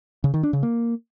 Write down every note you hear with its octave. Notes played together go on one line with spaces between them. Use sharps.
C#3
D#3
D4
C#3
A#3